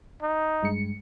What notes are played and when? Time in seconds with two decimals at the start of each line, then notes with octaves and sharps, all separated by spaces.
0.22 D#4
0.63 G2 G#3 C#7